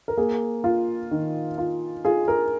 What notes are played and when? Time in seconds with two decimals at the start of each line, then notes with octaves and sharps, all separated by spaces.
0.08 A#4
0.17 A#3 G#4
0.64 F4
1.11 D#3
1.58 F4
2.05 F4 G#4
2.28 A#4